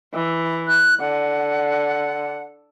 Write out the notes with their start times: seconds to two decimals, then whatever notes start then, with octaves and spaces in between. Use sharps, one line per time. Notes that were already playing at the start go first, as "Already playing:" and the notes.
0.14 E3
0.68 F#6
1.00 D3 F#5